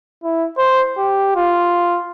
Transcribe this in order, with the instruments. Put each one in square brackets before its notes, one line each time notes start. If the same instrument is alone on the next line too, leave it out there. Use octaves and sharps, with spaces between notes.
[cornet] E4
C5
G4
F4